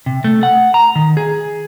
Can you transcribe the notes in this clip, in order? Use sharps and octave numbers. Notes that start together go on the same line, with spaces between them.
C3
A3
F#5
A#5
D#3
G#4